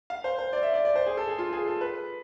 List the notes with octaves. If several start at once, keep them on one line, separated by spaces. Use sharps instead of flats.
F5
C5
C5
D5
E5
D5
D5
C5
G#4
A4
G#4
F4
G#4
A4
B4